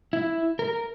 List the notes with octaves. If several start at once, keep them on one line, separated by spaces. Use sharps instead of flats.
E4
A#4